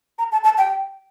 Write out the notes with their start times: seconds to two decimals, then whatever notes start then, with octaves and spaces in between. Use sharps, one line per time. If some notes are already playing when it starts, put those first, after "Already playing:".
0.19 A#5
0.32 A5
0.44 A5
0.58 G5